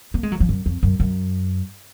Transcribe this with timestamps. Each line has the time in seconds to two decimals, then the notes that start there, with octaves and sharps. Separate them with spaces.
0.14 A#3
0.23 G#3
0.32 F#3
0.40 F3
0.49 F#2
0.66 F2
0.83 F#2
1.00 F#2